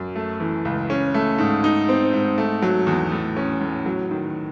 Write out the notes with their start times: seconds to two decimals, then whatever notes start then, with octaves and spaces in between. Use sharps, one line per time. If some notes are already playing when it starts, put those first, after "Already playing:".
Already playing: F#2
0.16 A3
0.40 E3
0.65 C#2
0.90 C#4
1.14 A3
1.38 G#2
1.64 D#4
1.89 C4
2.13 G#2
2.38 A3
2.62 F#3
2.87 E2
3.12 A2
3.37 C#4
3.61 A2
3.86 F#3
4.11 D#3